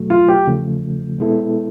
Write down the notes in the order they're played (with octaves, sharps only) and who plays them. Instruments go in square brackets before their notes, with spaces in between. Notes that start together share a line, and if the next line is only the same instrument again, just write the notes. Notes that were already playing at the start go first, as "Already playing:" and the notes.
Already playing: [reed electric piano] E2 B2 F#3 A3
[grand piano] F4
G4
[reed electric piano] E2 C#3 F3 A3
B2 G#3 B3 E4 A4